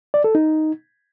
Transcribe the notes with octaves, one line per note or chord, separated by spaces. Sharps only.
D5
A4
D#4